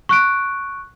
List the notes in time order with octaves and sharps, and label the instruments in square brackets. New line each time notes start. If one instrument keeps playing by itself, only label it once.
[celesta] C#6 F#6 D7